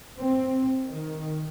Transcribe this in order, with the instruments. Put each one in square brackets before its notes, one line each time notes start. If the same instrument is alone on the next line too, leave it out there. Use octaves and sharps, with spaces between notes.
[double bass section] C4
D#3